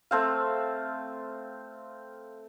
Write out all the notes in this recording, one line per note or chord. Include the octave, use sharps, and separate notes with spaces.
A3 C4 F5